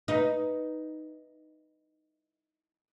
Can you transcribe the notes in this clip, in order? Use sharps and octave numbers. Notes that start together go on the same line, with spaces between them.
D#4 B4